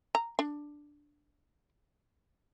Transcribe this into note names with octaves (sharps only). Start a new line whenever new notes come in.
A#5
D4